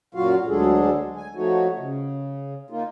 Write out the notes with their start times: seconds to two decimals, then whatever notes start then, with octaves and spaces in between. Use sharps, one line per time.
0.15 F#2 A#2 F#3 F4 F#4 F5
0.48 D2 F#3 G#3 D4 G#4 A4
1.16 G#5
1.35 F3 A3 D#4 F#4 C#5
1.77 C#3
2.71 A#3 D#4 F4